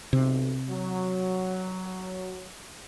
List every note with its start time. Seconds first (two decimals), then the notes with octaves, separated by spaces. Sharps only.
0.13 B1 C3
0.69 F#3